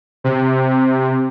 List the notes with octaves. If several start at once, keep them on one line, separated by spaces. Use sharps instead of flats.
C3